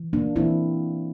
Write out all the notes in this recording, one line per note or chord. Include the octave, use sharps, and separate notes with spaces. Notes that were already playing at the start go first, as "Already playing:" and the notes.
Already playing: E3
A#3 D4
E3 A#3 C4 E4